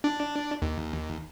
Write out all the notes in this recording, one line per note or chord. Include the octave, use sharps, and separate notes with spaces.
D4
D#2